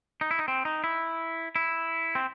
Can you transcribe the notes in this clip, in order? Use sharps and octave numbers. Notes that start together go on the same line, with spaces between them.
D#4
E4
D#4
C4
D#4
E4
E4
C4